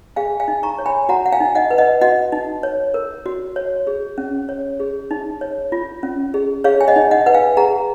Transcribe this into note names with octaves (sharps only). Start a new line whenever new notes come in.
G#4 F5 G#5
F5 G#5
D#4
A#5 C#6
C#5
G#5 B5
F#4 F#5 A#5
F#5
F5 G#5
D#4
D#5 F#5
B4
D#5 F#5
F#4 D#5 F#5
D#4
C#5
A#4
F#4
C#5
G#4
C#4
C#5
G#4
D#4
C#5
F4
C#4
G#4
G#4 C#5 F5
G#5
D#5 F#5
D#4
D#5 F#5
B4 F#5
F5 G#5
G#4 F#5 A#5